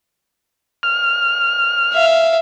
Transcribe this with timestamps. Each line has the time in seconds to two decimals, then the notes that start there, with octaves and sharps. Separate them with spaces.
0.83 F6
1.94 E5 F5